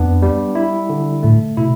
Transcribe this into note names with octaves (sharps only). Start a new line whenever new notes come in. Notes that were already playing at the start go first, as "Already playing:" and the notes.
Already playing: F2 B3 D4
G3
E4
D3
A2 A3
B2 E4